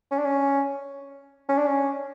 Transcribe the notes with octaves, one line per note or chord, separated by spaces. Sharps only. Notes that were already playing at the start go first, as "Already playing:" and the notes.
C#4
D4
C#4
C#4
D4
C#4